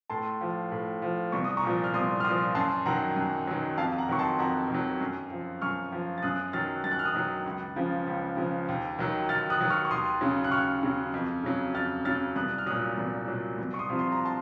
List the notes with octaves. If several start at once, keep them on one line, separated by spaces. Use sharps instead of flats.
A2 A5 C6
F3
A2
F3
C2 C#6
D#6
A#5 C#6
A#2 F3
F6
C2 C6 D#6
F6
A#2 F3 C6 D#6
F#2 A5 C6
D#3 F#3 F#5 A#5
F#2
D#3 F#3
F2 F5 A5
F#5 A#5
D#3 F#3 C#6
A5 C6
F2 F#5 A#5
D#3 F#3
F#2
F3
F#2 C#6 F6
F3
A6
F#2 D#6 F#6
D#3 F#3 F6 A6
F#2 A6
F#6
F6
D#6 F#6
D#3 F#3
C#2
C#3 F3
C#2
C#3 F3
D#2
D#3 F#3
D#2 F6 A6
D#6 F#6
D#3 F#3
C#6 F6
C#6
D#2 C6 D#6
C#3 F#3
F#6
D#2 C#6 F6
C#3 F#3
F2
C#3 F#3
F2 F6 A6
C#3 F#3 F6 A6
C2 D#6 F#6
F6
A#2 F#3 D#6 F#6
C2
A#2 F#3
C2
C#6
C6 D#6
C3 F3
C6
A#5
A5 C6